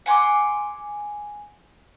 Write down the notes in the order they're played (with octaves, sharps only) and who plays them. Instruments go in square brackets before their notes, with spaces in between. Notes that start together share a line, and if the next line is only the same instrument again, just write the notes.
[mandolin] F#5 G#5 C6 D6